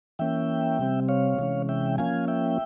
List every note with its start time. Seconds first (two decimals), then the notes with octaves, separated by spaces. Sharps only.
0.19 E3 A#3 C#4 E5 G5
0.79 C3 G3 C4
1.08 C#5 F5
1.39 C3 E3 G#3 C#4
1.69 E5 G5
1.98 F3 A#3 C#4 F5 G#5
2.28 E5 G5